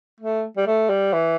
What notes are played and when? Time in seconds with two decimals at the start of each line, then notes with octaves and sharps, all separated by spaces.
0.20 A3
0.57 G3
0.67 A3
0.89 G3
1.13 E3